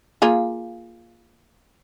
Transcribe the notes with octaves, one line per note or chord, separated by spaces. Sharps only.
A#3 F4 G#4